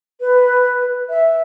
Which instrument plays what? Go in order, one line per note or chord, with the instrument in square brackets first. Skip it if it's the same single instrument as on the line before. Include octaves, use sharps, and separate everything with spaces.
[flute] B4
E5